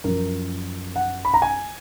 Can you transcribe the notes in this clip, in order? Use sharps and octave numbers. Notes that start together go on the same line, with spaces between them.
F#2 F3 A#4
F#5
B5
A#5
G#5